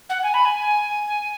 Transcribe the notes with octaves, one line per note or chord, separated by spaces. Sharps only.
F#5
G#5
B5
G#5